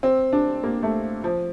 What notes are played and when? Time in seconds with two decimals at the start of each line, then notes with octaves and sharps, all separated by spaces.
0.03 C4
0.33 D4
0.64 A#3
0.83 A3
1.24 F3